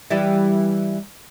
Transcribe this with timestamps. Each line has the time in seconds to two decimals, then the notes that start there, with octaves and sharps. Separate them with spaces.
0.10 E3 G3 E4